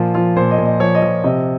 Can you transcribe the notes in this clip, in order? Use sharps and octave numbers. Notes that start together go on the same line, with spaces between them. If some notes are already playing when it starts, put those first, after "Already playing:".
Already playing: A#2 F3 F4
F3 F4
A#2 C5
D#5
A#2
D#5
F3 C#5
D#5
F3
C3 D#5